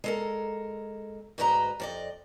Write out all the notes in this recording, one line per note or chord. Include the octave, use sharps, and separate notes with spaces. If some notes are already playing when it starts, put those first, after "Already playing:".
G#3 A4 A#4
D2 G#2 F#4 B4 D#5 A#5
F2 D5 D#5